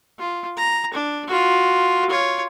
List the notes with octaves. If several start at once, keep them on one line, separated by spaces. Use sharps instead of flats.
F4
A#5
D4
F4 F#4
F4 C#5